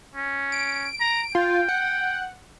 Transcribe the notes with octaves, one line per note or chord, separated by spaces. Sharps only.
C#4
D7
A#5
F4 G5
F#5